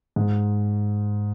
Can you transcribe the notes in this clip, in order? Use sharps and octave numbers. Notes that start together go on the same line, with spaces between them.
G#2